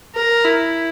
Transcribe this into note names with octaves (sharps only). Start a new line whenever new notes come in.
A#4
E4